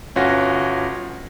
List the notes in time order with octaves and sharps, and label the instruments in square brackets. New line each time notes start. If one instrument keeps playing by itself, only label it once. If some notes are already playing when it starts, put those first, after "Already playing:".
[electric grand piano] G1 C#4 F4 F#4 A#6